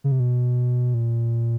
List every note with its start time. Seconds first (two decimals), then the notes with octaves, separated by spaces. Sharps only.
0.04 C#3
0.12 C3
0.20 B2
0.94 A#2